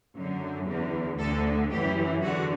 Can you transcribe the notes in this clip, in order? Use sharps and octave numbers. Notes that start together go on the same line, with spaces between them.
F#2 D3
E2 D3
D2 D3 A4
F#2 E3 G4
E2 D3 F#4